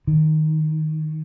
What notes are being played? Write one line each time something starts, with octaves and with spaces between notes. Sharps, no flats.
D#3